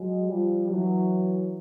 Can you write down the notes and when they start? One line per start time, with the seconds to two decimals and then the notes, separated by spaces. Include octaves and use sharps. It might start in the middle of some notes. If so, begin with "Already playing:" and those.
Already playing: F#3 G#3
0.29 F3 G3
0.70 E3 F#3